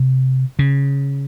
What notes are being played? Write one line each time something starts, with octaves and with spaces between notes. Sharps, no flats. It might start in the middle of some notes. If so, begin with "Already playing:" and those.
Already playing: C3
C#3